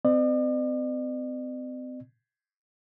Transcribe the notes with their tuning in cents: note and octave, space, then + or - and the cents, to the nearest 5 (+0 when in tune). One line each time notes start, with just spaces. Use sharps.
C4 -35 D5 +45